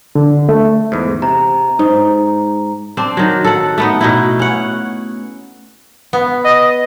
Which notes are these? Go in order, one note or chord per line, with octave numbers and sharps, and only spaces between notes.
D3
A3
E2 G#2
C3 A#5
G#2 D#4
C4 D4
D#3 F#3
A4 F#5
A3 B3 D#4
B2 D#4 E4
C#4 F#5
B3
D#5